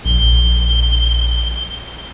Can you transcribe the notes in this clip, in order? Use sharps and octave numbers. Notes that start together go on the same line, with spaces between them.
A#1 G7